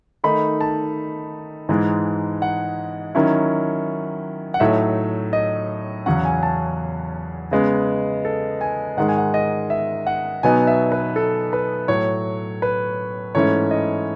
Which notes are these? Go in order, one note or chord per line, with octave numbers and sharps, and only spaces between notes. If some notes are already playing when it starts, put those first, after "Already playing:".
D#3 A3 D#4 B5
A5
G#2 E3 G#3 D#4
F#5
D#3 F#3 C#4 E4
F#5
A2 F#3 A3 D#4 E5
D#5
E2 C#3 F#3 C#4 F#5
G#5
A5
C#3 G#3 B3
A4
G#5
G#2 D#3 G#3 F#5
G#5
F#5
D#5
E5
F#5
B2 F#3 B3 D#4 G#5
E5
B4
A4
B4
A2 F#3 A3 C#5
B4
G#2 E3 A3 C#4 E4 C#5
D#5